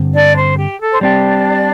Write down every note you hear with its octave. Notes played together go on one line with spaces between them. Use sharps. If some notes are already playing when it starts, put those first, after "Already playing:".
Already playing: G2 D3 C4
D4 D5
C5
G4
A4
C5
G3 C4 D4 G4 D5